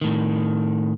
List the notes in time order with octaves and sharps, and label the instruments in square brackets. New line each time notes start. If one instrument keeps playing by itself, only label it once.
[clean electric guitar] A2 D#3